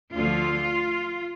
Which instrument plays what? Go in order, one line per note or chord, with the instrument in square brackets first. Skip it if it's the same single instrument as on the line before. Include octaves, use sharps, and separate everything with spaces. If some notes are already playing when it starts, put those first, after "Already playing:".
[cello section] D2 D3 F3 F4